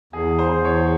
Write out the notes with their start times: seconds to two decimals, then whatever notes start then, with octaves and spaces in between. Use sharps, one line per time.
0.13 E2 G#4
0.39 C5
0.51 E2
0.65 C#5